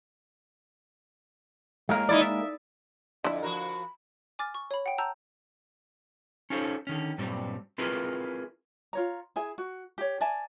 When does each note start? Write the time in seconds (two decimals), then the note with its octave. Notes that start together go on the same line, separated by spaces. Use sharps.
1.89 A2 G#3 A#3 A#4
2.09 D#4 E4 D5
2.21 E5
3.24 F2 D3 E4 E5
3.43 F3 F#4 A#4 B5
4.39 G#5 D6 F6 A6
4.55 C#6
4.71 C#5 B5
4.86 F#5 G5
4.98 A5 A#5 E6 G6
6.50 C#4 D#4 F4 A4 C5 C#5
6.87 D3 D#3 C#4
7.18 G2 A#2 F#3 G3 C4
7.78 C4 E4 F4 G#4 A#4 B4
8.93 F4 C#5 A#5
9.36 E4 G#4 G#5
9.58 F#4
9.98 G4 C#5
10.21 D5 E5 G#5 A5